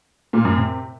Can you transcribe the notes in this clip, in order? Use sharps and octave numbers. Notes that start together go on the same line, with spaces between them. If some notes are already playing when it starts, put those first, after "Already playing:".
A#2
F#2
C3